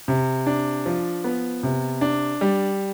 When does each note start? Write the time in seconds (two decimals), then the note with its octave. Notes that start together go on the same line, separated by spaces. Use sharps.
0.08 C3
0.46 D4
0.86 F3
1.24 B3
1.63 C3
2.01 D4
2.41 G3